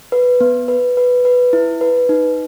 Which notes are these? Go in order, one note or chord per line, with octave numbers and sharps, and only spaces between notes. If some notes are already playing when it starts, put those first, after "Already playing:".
B4
B3
B4
B4
B4
E4
B4
D#4